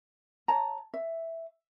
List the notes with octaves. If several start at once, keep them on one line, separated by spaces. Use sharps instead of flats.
C#5 A5 A#5
E5